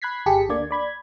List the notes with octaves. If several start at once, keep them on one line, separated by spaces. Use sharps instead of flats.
B5 F#6 G#6 B6 C7
G1 G4 G#4 A5 B6 C#7
D2 D3 A#3 D5 G#6
D5 B5 G#6